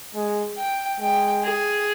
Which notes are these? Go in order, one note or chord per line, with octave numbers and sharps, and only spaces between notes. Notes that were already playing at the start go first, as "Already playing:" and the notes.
G#3
G5
G#3 G5
G#4